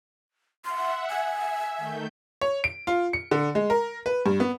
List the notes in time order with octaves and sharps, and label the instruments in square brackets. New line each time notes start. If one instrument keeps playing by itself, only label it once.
[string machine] E5 F#5 [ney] C6
[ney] G#5
[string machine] E5
D#3 A3 G6
[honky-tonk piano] C#5
D7
F4
C#7
D3
G#3
A#4
B4
G2
B3